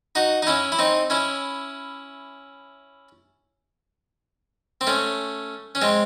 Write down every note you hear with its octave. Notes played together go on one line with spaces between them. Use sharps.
D#4 F#4
D#4
C#4 E4
E4
C4 D#4
C#4 E4
C4
A3 C#4
C#4
G#3 C4